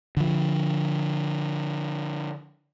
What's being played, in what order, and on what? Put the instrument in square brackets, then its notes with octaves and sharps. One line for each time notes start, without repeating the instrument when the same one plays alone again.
[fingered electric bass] D3 F3